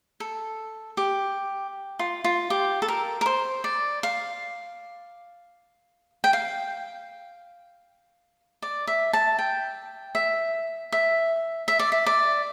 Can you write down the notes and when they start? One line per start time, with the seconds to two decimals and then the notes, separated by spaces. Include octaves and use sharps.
0.20 A4
0.97 G4
1.99 F4
2.24 F4
2.50 G4
2.82 A4
2.88 A#4
3.21 A#4
3.26 C5
3.64 D5
4.03 F5
6.24 G5
6.33 F5
8.62 D5
8.87 E5
9.13 A5
9.39 G5
10.15 E5
10.92 E5
11.68 E5
11.79 D5
11.92 E5
12.06 D5